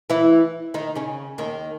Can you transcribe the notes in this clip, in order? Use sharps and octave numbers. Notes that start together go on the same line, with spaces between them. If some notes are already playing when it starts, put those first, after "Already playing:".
E3 E4
D#3 D#4
C#3 C#4
D#2 D#3